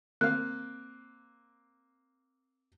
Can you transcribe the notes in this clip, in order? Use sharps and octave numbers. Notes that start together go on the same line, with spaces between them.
A#3 C4 F5 F#6